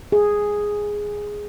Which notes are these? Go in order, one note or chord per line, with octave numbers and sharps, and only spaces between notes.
G#4